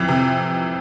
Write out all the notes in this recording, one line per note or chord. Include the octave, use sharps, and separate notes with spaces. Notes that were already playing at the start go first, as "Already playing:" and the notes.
Already playing: F2 E3
C3